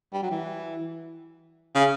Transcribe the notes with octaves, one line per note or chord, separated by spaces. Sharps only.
G3
F#3
E3
C#3